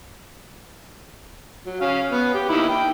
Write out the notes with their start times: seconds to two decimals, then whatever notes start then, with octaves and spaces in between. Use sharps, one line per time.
1.66 F#3
1.81 C#4 F5
2.11 B3
2.34 G4
2.49 D#3 A#3 E4
2.69 G5